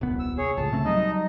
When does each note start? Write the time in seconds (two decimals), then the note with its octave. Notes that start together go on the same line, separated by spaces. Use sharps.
0.01 D#1 C2 B3
0.19 E6
0.38 G#4 C#5
0.57 C#2 A2 A5
0.72 C#3 A3 C4
0.85 F#3 G3 D#4 D#5